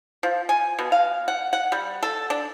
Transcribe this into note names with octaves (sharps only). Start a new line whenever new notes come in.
F3
G#5
B2
F5
F#5
F#5
G3
A4
D4